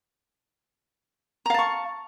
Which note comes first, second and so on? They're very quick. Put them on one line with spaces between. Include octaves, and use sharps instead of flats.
A#5 F5 A5 C#6